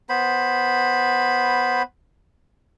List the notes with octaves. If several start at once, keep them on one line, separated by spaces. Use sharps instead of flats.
B3 C5 B5